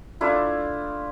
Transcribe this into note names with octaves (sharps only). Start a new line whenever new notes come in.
A3 D4 E4 F4